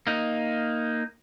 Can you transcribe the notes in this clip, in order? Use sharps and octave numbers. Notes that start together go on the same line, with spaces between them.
A#3 D#4